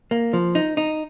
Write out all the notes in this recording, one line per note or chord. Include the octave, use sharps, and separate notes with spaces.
A#3
F3
D#4
D#4